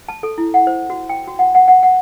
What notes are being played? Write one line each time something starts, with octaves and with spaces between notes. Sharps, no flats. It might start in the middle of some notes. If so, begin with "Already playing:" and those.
A5
A4
E4
F#5
C5
F#4
G5
F#4
F#5
F#5
F#5
F#5